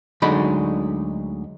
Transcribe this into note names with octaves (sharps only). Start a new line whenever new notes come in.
D2 D3 F#3 G#3 D#4 B5